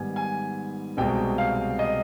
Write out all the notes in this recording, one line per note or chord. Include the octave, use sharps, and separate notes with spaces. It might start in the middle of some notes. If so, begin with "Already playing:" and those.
Already playing: G#2 D#3 G3 B3 G#5
G#5
C2 B2 G#3 C4 G5
F5
D#5